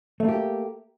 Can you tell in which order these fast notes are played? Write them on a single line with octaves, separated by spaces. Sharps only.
A3 A#3 G4